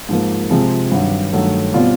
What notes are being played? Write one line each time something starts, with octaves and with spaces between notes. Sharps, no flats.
G#2 F3 A#3
C3 F3 G#3 C4
G2 D#3 F#3
G2 D#3 F#3 A3
B2 G3 C4 F4